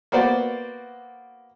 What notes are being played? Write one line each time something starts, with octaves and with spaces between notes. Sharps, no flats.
A#3 B3 F#4 C5 D5